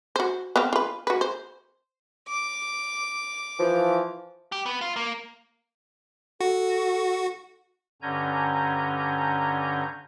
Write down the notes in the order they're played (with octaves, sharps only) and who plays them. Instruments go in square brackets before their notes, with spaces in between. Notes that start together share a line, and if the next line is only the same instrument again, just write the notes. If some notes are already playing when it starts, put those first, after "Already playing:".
[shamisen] F#4 C5
B3 C4 F5
F4 B4
F#4 B4
C5
[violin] D6
[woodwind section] E3 F3
[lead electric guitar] G4
B3
F4
A#3
[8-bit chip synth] F#4 [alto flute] A4
[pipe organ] G2 D3 C#4 G#5 A#5 G6